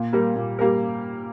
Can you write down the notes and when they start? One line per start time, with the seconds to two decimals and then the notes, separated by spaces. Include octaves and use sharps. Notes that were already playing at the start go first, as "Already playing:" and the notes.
Already playing: A#2
0.13 G3 A#3 G4 A#4
0.36 A#2
0.59 G3 A#3 G4 A#4